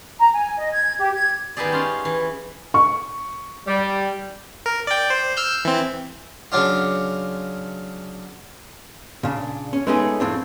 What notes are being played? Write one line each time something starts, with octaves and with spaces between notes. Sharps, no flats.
A#5
G#5
D#5
G#6
G4
G#6
D#3 B3 D#4 G4 G#4 D5
C#4 F4 C6
E3
C#6
G3
A#4
D5 G5
C5
E6 F6 G6
E3 C4
C#3 F#3 D4 F4
A#2 C#3 D4
C#4
G#3 A3 B3 C#4 D#4 G#4
F2 A2 C4 D4